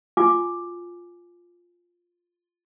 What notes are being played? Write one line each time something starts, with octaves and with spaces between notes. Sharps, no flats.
F4 F#4 G#5 D6